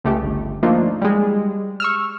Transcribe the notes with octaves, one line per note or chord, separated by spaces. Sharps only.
C#2 A3 G4
G1
F3 A3 A#3 D4 D#4 F4
G3 G#3
C#6 E6 F6